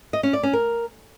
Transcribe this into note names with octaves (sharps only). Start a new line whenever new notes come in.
D#5
C#4
D5
C#4
A#4